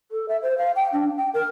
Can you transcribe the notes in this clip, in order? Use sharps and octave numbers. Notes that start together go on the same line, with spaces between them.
A4
E5
C5
F5
G5
D4
G5
A#4